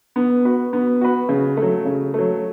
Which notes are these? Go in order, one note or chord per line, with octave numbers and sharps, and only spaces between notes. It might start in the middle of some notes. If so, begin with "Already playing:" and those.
B3
F#4 B4
B3
F#4 B4
C#3
A3
F#3
C#3
F#3 A3